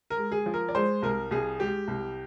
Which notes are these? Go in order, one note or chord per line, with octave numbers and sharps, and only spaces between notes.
A#4
G#3
G#4
F3
A#4
D5
G#3 C5
C2 A#4
C2 G#4
G#3 G4
C2